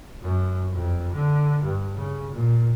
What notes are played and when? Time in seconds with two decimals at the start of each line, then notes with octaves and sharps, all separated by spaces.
0.22 F#2
0.72 F2
1.13 D3
1.62 G2
1.95 C#3
2.32 A#2